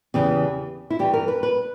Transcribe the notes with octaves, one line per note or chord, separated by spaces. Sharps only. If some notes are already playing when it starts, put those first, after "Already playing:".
E2 C#3 E3 G4
E4
G2 E3 G4
A#4
B4
B4